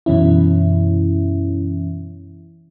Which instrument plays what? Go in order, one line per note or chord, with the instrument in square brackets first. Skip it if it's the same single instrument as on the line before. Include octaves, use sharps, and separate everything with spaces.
[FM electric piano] F#2 B2 E3 C#4 E4